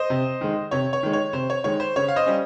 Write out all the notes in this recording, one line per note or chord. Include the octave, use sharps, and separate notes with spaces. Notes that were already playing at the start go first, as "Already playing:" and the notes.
Already playing: C5 D#5
C3
D#3 G#3
C3 C#5
C#5
D#3 G#3
C#5
C3 C5
C#5
D#3 G#3 C#5
C5
C#3 C#5
F5
C5 D#5
G3 C#4